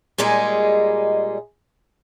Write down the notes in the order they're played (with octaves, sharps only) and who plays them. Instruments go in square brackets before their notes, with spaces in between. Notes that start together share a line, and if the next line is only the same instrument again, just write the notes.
[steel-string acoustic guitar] A#2 G3 G#3 D#4 G#4